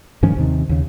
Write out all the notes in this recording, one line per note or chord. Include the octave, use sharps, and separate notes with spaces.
G2 D#3 F3 C#4
D#2 C3 D#3
D#2 C#3